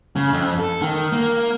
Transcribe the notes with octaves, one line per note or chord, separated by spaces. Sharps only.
C#3
F2
A4
D#3
A#3